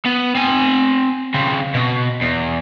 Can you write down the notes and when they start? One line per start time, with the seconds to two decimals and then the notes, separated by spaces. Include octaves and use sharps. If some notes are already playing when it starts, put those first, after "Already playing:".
0.06 B3
0.35 C4 G#5
1.34 C#3 C4
1.74 B2
2.22 E2